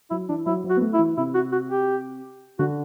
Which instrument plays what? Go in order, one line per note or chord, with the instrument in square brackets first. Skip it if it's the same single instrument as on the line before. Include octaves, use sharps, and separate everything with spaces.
[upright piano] F#3 [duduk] E4
[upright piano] E3 [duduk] D4
[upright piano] F#3 [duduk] E4
[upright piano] F#3
[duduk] F#4
[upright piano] B3
A3
[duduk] E4
[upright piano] E3
[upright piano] C3 [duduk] E4
[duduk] F#4
F#4
G4
[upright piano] D3 [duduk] F#4